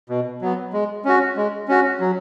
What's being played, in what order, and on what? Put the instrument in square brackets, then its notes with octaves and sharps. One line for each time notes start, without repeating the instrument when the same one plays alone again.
[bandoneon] B2
F#3 B3
G#3
C#4 F#4
G#3
C#4 F#4
F#3